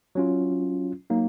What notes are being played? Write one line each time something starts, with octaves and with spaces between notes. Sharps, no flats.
F#3 C#4 F4
F#3 A#3 D#4